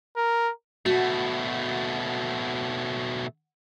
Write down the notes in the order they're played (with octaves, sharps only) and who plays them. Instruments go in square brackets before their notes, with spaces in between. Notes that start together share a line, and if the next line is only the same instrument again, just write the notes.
[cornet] A#4
[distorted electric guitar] B2 A3 [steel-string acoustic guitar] F#4